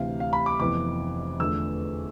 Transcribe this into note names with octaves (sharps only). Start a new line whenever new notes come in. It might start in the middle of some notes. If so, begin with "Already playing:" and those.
Already playing: D2 C3 E3 F5
F5
B5
D6
F1 F2 E3 B3 D6
E2 D3 F3 A3 E6